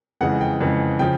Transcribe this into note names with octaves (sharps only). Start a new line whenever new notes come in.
F2 C#3 E3 G#3 F#5
G5
F2 C#3 E3 G#3
C#3 F3 G5